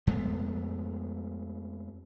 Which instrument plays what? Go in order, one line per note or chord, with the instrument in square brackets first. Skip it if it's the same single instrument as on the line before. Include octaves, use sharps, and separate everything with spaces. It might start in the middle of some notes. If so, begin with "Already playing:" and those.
[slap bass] F2 G#3 A3 B3